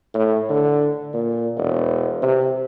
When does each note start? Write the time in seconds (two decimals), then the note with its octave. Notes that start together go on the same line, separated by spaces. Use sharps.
0.15 A2
0.50 D3
1.14 A#2
1.58 E1
2.23 C3